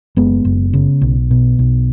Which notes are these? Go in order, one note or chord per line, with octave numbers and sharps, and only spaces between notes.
F#1 G#3 B3
F#1
C#3
B1
B2
B1